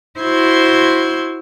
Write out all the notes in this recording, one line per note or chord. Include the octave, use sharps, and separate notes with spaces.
E4 F#4 C5 C6 G#6